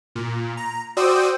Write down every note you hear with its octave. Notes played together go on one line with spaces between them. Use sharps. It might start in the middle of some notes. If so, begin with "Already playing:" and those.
A#2
A#5
F#4 C5 D5 G5 D#6 E6